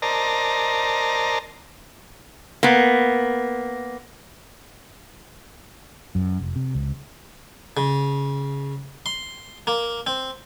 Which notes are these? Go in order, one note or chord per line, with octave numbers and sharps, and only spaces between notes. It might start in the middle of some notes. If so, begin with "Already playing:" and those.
A#4 C5 D5 D#5 A5 A#5
A#3 B3
F#2
F1
C3
C#2
C#3
C6
A#3
C4